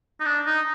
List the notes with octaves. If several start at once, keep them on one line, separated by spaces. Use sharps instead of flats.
D#4
D4
D#4